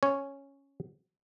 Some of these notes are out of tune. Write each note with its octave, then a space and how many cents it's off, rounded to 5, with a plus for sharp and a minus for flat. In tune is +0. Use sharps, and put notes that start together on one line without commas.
C#4 -5 C#5 +0